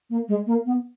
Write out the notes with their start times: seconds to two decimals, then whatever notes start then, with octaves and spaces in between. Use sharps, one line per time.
0.10 A#3
0.28 G#3
0.46 A#3
0.65 B3